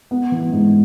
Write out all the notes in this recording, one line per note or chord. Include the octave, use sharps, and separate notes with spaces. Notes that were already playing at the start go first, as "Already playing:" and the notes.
B3
E3
G#2